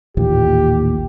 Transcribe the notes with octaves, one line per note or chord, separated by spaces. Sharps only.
A1 D#2 A#2 G4